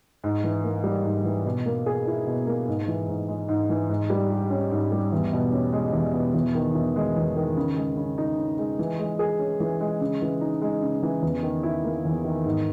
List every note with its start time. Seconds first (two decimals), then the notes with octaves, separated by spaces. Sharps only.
0.24 G#2
0.44 E3
0.64 A#3
0.84 G3
1.05 G#2
1.24 E3
1.46 B2
1.66 A#3
1.86 G#4
2.07 E4
2.27 B2
2.47 A#3
2.68 G#2
2.88 E3
3.08 G#2
3.28 G#3
3.48 G#2
3.70 E3
3.89 G#2
4.10 G3
4.30 G4
4.50 C#4
4.71 G#2
4.92 G3
5.12 E2
5.33 B2
5.52 C#4
5.73 G#3
5.93 E2
6.14 B2
6.34 E2
6.55 D#3
6.75 E2
6.96 G#3
7.16 E2
7.36 D#3
7.57 C#3
7.76 G#3
7.97 C#3
8.18 D#4
8.38 C#3
8.59 G#3
8.79 E3
8.99 G#3
9.19 G#4
9.39 C#4
9.60 E3
9.81 G#3
10.01 C#3
10.21 E3
10.41 D#4
10.62 G#3
10.82 C#3
11.03 E3
11.22 E2
11.43 D#3
11.63 E4
11.84 A#3
12.05 E2
12.25 D#3
12.45 G#2